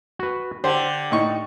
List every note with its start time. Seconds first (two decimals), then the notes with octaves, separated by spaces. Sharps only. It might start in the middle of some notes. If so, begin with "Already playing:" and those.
0.19 F#4 B4
0.64 D3 G4 C5
1.11 A2 D#4 C#6